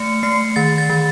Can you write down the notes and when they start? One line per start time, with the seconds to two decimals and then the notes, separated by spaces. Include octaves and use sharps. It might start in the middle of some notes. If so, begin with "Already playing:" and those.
Already playing: A3 C#7
0.23 A3 C7
0.56 D#3 A6
0.78 A6
0.89 D#3